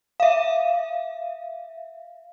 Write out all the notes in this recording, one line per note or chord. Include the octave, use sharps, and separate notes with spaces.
E5 F5